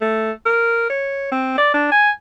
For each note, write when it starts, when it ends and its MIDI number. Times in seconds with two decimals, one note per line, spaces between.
0.01 0.31 57
0.46 0.87 70
0.90 1.29 73
1.32 1.54 60
1.58 1.71 74
1.74 1.90 62
1.92 2.10 80